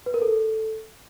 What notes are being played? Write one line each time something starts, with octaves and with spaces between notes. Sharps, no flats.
B4
A#4
A4